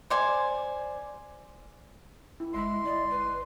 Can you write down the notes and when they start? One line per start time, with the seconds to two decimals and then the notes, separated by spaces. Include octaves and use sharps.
0.10 C5 D5 G#5
2.40 E4
2.54 G1 G#3 E5 B5 C6
2.84 E4 D5 D#5
3.11 B4